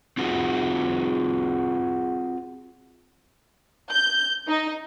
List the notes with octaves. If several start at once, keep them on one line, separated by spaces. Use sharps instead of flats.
C4 F4 F#4 G#4
G6
D#4